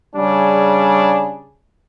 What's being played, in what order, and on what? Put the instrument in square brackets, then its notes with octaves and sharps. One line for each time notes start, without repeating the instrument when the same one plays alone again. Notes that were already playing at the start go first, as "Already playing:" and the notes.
[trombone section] C#3 G3 C#4 D4 G#4